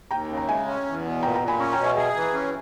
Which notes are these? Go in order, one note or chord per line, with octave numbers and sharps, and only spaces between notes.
D#2 G5 A#5
C#3
A#5
G#3 E5 G#5
C#4
E2
B2
A#2 G5 A#5
G5 A#5
A#2
G#5 B5
C#4 A#5 C#6
G5 A#5
B2
E5 G#5
G#4 E5 G#5
E3
C#4